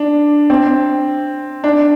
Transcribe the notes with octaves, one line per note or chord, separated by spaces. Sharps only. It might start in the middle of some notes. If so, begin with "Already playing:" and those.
Already playing: D4
C4
D4